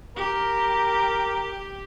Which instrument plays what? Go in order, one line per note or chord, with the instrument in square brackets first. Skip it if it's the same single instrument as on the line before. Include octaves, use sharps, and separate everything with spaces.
[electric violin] G4 [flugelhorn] A#4